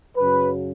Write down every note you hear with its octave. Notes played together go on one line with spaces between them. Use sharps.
F#2 C#3 F#3 B4